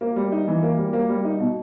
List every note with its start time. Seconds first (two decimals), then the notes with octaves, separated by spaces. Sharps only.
0.01 A#3
0.16 G3
0.32 D#4
0.47 E3
0.62 A#3
0.78 G3
0.93 A#3
1.09 G3
1.24 D#4
1.40 B2